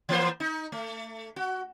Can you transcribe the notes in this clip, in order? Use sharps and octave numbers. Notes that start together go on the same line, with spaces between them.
E3 A#3 C5
D#4
A3
F#4